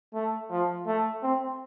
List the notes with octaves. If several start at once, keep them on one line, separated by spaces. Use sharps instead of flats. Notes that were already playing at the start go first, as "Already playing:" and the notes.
A3
F3
A3
C4